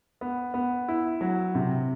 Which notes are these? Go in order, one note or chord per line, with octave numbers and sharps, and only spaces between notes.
B3
B3
E4
F#3
C3